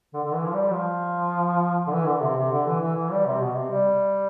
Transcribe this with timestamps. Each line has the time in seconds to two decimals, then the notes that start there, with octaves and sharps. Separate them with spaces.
0.14 D3
0.24 D3
0.34 E3
0.47 F3
0.54 G3
0.73 F3
1.87 D3
1.92 E3
2.06 D3
2.22 C3
2.37 C3
2.51 D3
2.66 E3
2.81 E3
2.96 E3
3.12 G3
3.26 C3
3.41 B2
3.56 C3
3.71 G3